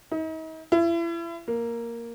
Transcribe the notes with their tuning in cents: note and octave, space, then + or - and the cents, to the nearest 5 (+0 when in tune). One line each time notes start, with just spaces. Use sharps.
D#4 +40
E4 +35
A#3 +0